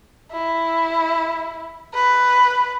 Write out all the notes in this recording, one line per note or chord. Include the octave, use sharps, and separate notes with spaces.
E4
B4